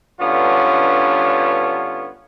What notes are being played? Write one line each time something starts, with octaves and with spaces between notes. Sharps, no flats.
G2 D3 B3 C#4 F4